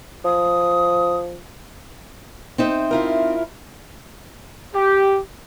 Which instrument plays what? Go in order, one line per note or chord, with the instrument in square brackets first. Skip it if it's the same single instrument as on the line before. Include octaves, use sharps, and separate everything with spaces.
[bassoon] F3 [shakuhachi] D#6
[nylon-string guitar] C4 D#4 E5
[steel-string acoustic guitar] E4 F4 A#4
[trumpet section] G4